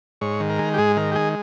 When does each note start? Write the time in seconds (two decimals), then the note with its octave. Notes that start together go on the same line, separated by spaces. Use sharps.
0.21 G#2 C#5
0.40 D#3
0.49 A#4
0.59 G#3
0.74 G4
0.78 G#2 G#4
0.97 D#3 A#4
1.12 G4
1.15 G#3 G#4